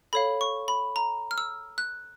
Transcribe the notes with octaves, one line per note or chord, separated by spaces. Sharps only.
A4 C#5 F5 B5
C#6
B5
A#5
F6
E6
F#6